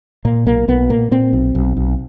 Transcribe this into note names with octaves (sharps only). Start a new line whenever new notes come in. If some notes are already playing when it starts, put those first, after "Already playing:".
A#2 A#3
B1 A#3
B1 B3
A#2 A#3
A#2 C4
B1
B1
B1